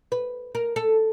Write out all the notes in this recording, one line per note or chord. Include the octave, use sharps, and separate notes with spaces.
B4
A#4
A4